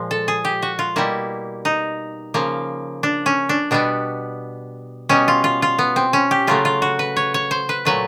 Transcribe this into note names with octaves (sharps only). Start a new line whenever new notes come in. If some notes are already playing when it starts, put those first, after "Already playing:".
Already playing: A#2 F3 G#3
A4
G#4
G4
F#4
F4
B2 G3 A#3 E4
D#4
C#3 F3 A#3
D4
C#4
D4
B2 G3 B3 D4
B2 G3 B3 C#4
F4
F4
F4
B3
C4
C#4
G4
C#3 F#3 A3 F4
F4
F#4
B4
C#5
C#5
C5
B4
A#2 F#3 A3 B4